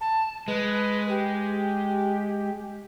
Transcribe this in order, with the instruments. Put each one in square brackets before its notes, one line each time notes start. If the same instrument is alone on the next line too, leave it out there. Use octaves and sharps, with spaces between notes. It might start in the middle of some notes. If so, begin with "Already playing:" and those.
[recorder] A5
[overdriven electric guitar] G#3 [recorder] B4
[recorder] G4